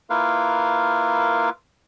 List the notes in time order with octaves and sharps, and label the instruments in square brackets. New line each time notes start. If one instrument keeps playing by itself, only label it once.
[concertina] A#3 E4 F4 A#4 B4 F5